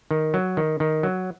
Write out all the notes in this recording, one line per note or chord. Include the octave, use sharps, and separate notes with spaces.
D#3
F#3
D#3
D#3
F#3